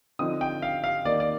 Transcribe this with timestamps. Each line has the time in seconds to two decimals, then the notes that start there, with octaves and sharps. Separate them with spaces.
0.19 D3 F3 C4 D#4 D#6
0.41 G5
0.62 F5
0.84 F5
1.05 D#3 A#3 D#4 D5
1.20 D5